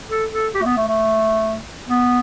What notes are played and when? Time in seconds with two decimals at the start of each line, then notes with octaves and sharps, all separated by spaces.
0.10 A4
0.32 A4
0.54 G4
0.62 A3
0.66 B3
0.77 A3
0.88 A3
1.89 B3